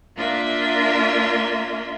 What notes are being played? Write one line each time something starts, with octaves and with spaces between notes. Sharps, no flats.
A#3 D4 F4 A#4 E5